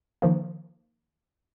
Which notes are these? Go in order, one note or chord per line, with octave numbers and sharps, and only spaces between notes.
D#3 F3 A#3